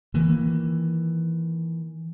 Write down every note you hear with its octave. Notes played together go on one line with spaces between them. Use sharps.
D#3 E3 A#3